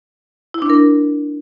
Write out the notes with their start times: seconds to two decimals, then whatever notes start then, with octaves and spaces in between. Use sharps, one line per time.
0.54 E4
0.62 D4
0.70 A#4